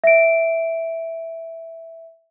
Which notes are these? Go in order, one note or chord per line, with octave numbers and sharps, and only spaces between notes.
E5 D7